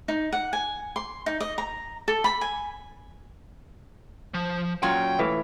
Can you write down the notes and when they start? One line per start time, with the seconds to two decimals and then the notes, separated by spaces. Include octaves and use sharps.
0.08 D#4
0.32 F#5
0.53 G#5
0.96 C6
1.26 D#4
1.40 D#5
1.58 A#5
2.08 A4
2.24 B5
2.41 G#5
4.34 F3
4.83 A#2 F#3 C#4 F4 G5
5.19 A2 E3 F5